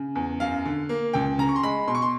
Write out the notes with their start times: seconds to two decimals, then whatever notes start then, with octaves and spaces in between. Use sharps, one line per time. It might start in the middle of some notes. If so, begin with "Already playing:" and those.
Already playing: C#3
0.15 E2
0.40 F#2 F5
0.65 D3
0.89 A#3
1.13 C#2 G5
1.38 C#3 A#5
1.49 C#6
1.56 C6
1.63 G#3 B5
1.87 B2 C6
1.95 C#6
2.02 C6